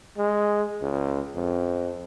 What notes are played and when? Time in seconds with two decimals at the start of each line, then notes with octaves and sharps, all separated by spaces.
0.18 G#3
0.82 C#2
1.36 F2